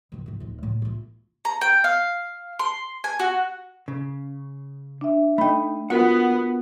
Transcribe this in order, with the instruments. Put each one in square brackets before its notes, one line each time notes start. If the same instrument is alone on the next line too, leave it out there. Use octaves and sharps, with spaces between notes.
[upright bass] G#2 D#3
G#2 C4
D1 D#4
A2
E4 F4
[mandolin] A#5
G5
F5
C6
G#5
F#4
[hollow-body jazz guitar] C#3
[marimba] D4 E5
[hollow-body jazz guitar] A3 D#4 [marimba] G5 B5
[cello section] B3 [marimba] F4 F#4 A#4 [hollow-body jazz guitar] F#5